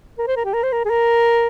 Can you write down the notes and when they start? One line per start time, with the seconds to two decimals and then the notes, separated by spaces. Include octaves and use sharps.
0.18 A#4
0.28 C5
0.36 A#4
0.45 G4
0.53 A#4
0.63 C5
0.72 A#4
0.85 G#4
0.90 A#4